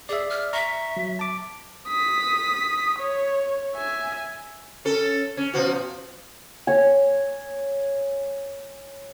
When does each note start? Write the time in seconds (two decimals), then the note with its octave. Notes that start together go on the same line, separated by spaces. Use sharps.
0.09 G#4 D5 E5
0.30 F6
0.53 E5 A#5 C#6
0.97 F#3
1.19 A5 D6
1.88 D#6 B6
2.98 C#5
3.76 E5 G#5
4.85 C#4 A4
5.37 C#4
5.54 B2 F3 F#4
6.67 C#5 G#5